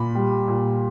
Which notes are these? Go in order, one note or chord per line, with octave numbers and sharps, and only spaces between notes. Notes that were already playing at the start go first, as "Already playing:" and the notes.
Already playing: A#2 B5
G3
A#2